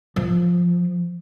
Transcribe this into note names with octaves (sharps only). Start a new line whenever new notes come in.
F3